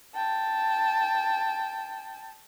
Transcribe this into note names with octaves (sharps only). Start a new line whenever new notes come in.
G5 A5